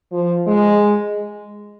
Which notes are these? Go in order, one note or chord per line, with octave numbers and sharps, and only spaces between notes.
F3
G#3